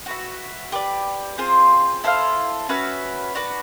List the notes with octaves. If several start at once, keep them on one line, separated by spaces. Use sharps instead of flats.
F#4 B4 E5
G4 B4 D5
C4 F4 G#4 C5
E4 A4 C5 F5
C#4 F#4 B4 E5
D4 F#4 B4